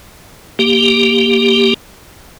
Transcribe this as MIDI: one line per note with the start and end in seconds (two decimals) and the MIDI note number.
0.59 1.74 58
0.59 1.74 67